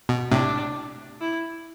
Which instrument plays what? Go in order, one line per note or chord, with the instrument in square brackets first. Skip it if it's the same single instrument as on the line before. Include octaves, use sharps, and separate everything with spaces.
[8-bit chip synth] B2
[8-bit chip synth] A2 C3 [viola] D4
[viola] E4